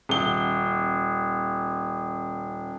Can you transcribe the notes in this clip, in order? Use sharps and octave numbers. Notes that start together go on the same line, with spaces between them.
D#1 G7